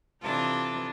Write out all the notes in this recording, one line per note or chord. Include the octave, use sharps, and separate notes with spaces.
C3 E3 D4 D#4 F4 A4